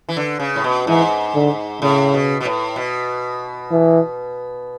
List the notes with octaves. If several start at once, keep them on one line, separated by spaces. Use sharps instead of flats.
E3
D3
C#3
A2
B2
G#2 E3
D3
A2 C#3
B2
B2
A2
B2
E3